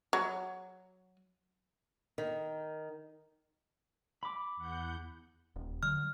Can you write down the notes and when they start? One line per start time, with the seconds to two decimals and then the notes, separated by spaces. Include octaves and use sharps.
0.13 F#3
2.18 D#3
4.23 B5 D6
4.56 E2 F#5 G6
5.56 D#1
5.83 D3 F#3 F6